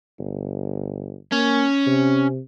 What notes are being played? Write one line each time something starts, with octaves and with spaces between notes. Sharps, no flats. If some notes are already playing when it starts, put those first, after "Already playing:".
G1
A#3 C#4
C3